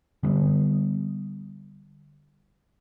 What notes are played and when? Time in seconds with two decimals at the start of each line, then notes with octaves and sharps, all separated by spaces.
0.23 D3 G3 A#3 B3